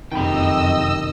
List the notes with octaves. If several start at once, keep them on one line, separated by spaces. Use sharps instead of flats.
F#1 F2 C3 D#3 D#5 G5 B5 E6